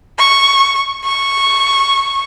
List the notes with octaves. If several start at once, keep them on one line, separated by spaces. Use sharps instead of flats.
C#6
C#6